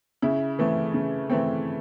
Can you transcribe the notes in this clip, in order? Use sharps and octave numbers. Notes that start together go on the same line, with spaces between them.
C#3 E4
E3 A3 C4
C#3
E3 A3 C4